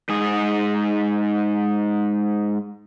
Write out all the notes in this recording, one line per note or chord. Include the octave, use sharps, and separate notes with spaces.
G#2 G#4